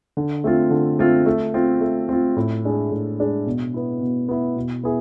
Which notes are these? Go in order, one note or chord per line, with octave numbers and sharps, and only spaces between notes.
D3
A3 C4 F4
D3
A3 C4 F4
A3
C4 F4
A3
C4 F4
A2
G#3 D4 G#4
A2
G#3 D4 G#4
B2
B3 E4
B2
B3 E4
B2
B3 E4 G#4